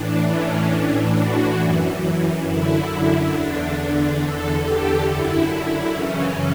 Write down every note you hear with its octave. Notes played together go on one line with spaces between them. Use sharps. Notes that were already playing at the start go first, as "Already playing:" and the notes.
Already playing: A2 E3 D4
C#4
A2 E3 D4
F#4
F#2 E3
F#2 D3 E4
E4
E2 D3 D4
D4
E2 D3 A4
G4
F#2 D3 E4
F#2 C#3 E3 C#4